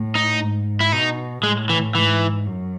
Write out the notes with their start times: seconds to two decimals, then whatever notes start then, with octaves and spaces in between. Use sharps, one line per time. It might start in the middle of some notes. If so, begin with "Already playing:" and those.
Already playing: A2
0.15 D#4
0.42 G#2
0.80 E4
0.92 B2 D#4
1.43 A2 G#3
1.70 E3
1.95 G#2 E3
2.47 F#2